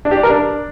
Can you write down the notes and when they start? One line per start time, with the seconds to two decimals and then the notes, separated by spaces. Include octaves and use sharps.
0.05 D4
0.11 G4
0.17 D5
0.23 A#4
0.29 D4